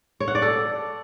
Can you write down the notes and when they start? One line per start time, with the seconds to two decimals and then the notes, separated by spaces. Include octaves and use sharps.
0.20 C#5
0.28 F#5
0.35 D5
0.42 A4